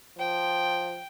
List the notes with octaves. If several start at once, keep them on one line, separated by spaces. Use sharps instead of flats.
F3 G5